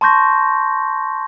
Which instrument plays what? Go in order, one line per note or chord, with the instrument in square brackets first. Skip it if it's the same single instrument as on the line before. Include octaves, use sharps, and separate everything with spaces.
[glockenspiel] A5 C6 C#6 G6 A#6